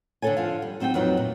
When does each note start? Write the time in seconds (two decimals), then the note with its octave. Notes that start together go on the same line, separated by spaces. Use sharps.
0.22 D3 D#3 G4 A4 C#5 G#5
0.37 D3 F3 F5
0.62 G3
0.80 F#3 C4 D#4 G#4 G5
0.94 F2 A#2 F#3 B3 D4 D#4
1.17 A#2